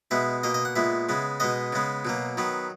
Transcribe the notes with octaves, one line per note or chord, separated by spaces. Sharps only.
B2 G#3 B3 E5
B2 A#3 D#5
D#5
F#5
A#2 G#3 B3 E5
C#3 G#3 B3
B2 G#3 B3 D#5
C#3 G#3 B3
B2 F#3 A#3
D#3 F#3 B3